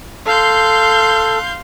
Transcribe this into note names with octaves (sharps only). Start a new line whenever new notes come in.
A4 F5 C6 G6